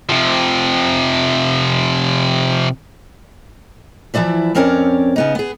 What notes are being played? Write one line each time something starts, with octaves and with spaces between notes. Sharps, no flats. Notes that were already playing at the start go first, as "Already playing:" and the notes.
C3 F3
E3 F3 E4 D5 E5
F2 C4 C#4 A#4 C#5 D5
C#3 B3 D#4
B3 G#4